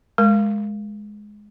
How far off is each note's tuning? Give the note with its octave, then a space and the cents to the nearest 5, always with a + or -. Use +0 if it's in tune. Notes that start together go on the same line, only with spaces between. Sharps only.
G#3 +5 A#4 +0